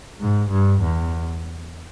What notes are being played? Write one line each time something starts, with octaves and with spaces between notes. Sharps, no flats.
G#2
G2
E2